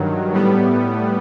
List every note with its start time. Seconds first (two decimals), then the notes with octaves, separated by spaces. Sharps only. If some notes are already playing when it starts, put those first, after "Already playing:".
Already playing: G2 D#3 F#3
0.32 A2 G3 B3